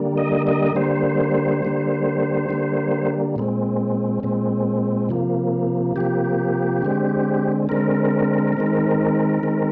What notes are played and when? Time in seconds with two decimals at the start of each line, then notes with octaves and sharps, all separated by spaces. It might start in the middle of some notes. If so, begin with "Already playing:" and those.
Already playing: D3 G3 A#3
0.18 D#5
0.47 D#5
0.75 D3 G3 A#3 C5
1.62 D3 G3 A#3
2.50 D3 G3 A#3
3.36 A#2 G#3 C4
4.23 A#2 G#3 C4
5.09 C3 F3 A#3
5.96 C3 F3 A#3 G4
6.82 D3 G#3 C4
7.69 D3 G#3 C4 A#4
8.57 D#3 G#3 C4
9.43 D#3 G#3 C4